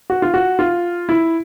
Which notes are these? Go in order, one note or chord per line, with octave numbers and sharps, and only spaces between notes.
F#4
F4
F#4
F4
E4